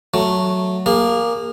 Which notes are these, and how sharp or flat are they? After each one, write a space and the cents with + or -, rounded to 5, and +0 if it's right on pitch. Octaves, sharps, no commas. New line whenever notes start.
F#3 +0 A3 +0
A#3 +0 G#4 -30